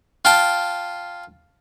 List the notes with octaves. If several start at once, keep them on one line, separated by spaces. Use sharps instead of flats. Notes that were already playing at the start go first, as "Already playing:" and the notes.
F4 G5 A5